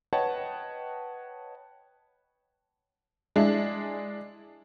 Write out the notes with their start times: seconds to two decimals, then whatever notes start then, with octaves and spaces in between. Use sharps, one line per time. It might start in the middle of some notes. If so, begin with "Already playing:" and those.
0.13 B4 C#5 D#5 F#5 G5 A5
3.36 G#3 D4 E4